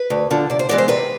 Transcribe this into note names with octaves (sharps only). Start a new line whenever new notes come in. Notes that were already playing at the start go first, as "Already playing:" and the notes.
Already playing: B4
D2
D3 F3
C3 D5
C5
E3 G#3 B3 D5
C5
C3 B4